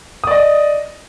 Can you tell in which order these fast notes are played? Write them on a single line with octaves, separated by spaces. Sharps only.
D#6 D5 D#5